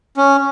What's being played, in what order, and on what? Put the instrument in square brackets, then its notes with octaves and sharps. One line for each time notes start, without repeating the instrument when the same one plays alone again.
[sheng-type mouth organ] C#4